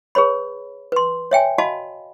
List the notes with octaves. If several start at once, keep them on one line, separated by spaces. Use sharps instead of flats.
G#4 B4 C#5 B5
B4 C6
C#5 E5 G5 G#5
F#4 D#5 F5 A5 B5